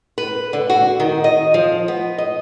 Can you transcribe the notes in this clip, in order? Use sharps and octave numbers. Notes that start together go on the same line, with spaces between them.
B4
D3
F#4
D#3
D#5
F3
B3
D#5